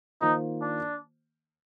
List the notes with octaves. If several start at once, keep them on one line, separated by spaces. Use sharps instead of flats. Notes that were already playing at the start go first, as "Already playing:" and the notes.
D#3 A#3 D#4 F4 C5
D4